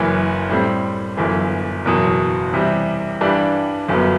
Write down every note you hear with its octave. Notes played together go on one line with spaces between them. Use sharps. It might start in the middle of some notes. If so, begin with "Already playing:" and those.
Already playing: F#1 F#2 E3
A2 G3 C4
G1 F#2 E3
F#1 E2 B2 F#3
E2 C3 G3
G2 E3 G3 D4
G1 F#2 F#3 B3